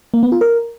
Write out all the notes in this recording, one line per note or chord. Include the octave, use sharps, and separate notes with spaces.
A#3
B3
F4
A#4